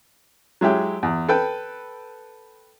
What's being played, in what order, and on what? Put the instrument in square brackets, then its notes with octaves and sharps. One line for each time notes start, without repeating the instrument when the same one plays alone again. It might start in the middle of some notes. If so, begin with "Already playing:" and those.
[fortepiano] F#3 G#3 E4 G4
E2
A4 B4 G5